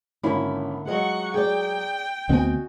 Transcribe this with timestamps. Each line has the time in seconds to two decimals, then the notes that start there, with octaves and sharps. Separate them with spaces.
0.23 G#1 D3 A#3 C#4 E4 B5
0.87 F#3 G#3 F4 D#5 F#5 C#6
1.34 G#4 D5 G5
2.29 D2 B3 C4 F#4 D#5 G#5